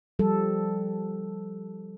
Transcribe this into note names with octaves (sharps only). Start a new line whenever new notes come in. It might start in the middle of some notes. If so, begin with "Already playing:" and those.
F3 G3 A4